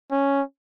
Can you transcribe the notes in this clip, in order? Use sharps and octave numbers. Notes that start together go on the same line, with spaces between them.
C#4